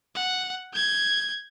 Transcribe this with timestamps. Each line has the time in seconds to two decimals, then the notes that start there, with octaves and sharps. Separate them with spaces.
0.15 F#5
0.73 G6 G#6